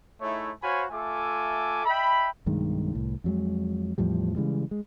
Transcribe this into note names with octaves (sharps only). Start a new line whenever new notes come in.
A3 D#4 E4 G#4 C#5
F#4 C5 C#5 F5 G#5 B5
A3 F4 A4 E5 G#5 D6
D#5 E5 G5 B5
B1 G2 D#3 G#3
C2 A2
F2 F#3 G#3
E2 A2 F3 G3
C#3 E3 G3 G#3
G#3